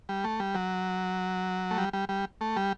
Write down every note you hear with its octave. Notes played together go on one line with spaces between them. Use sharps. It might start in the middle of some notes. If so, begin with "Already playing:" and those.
G3
A3
G3
F#3
A3
G3
G3
G3
A3
G3